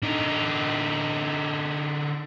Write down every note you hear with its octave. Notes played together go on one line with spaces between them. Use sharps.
D3 D#4